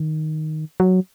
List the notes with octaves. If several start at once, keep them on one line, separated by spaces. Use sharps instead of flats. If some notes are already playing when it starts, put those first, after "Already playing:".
Already playing: D#3
F#3